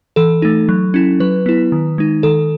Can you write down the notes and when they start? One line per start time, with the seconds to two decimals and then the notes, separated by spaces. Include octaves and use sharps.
0.16 E3 A4
0.42 A3 D#4
0.69 F#3
0.94 C#4 E4
1.20 F#3 B4
1.46 B3 E4
1.72 D#3
1.98 G#3 D#4
2.23 D#3 A4